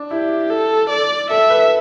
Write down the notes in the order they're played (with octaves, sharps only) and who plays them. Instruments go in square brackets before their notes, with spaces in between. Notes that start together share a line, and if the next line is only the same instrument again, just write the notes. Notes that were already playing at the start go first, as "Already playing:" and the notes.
Already playing: [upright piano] D4
[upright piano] E4 [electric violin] G4
[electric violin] A4
D5
[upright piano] A4 [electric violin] E5
[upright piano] B4